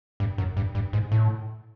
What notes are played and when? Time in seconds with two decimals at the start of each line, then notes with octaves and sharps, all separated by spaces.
0.20 G2
0.38 F#2
0.57 G2
0.75 G2
0.93 G#2
1.12 A2